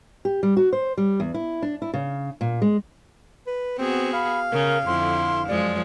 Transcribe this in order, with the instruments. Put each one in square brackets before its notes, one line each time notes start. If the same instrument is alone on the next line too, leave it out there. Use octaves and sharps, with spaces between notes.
[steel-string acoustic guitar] G4
G3
F#4
C5
G3
E2
E4
D4
E4
C#3
A#2
G#3
[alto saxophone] B4
[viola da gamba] B3 F#4 G#4 [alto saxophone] C4
[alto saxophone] F5 [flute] B5
[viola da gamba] C#3 [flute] A#4
[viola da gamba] F2 D3 E4 [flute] C6
[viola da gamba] F#2 F3 G#3 [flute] D5